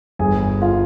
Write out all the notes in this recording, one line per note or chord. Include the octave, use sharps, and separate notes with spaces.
G1 G#4 G#5
F4 F5